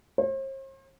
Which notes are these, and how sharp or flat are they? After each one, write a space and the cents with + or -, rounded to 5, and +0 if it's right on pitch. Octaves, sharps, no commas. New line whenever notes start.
C5 +45